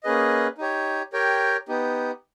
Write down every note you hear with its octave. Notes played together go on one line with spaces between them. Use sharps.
A#3 C#4 G#4 B4 D#5
D#4 G4 C#5
G4 A#4 C#5 G5
B3 D#4 G4